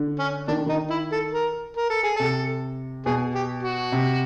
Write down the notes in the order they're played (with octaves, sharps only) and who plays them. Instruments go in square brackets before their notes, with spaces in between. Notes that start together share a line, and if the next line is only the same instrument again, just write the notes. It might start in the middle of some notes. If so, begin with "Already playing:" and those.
Already playing: [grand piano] D3
[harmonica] C#4
[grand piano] D#3 [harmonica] D4
[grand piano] D3
[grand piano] D#3 [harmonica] D#4
[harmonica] E4
A4
A#4
A#4
A4
G#4
[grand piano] C3 [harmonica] A4
[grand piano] B2 [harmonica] G#4
[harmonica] G4
F#4
[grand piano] C3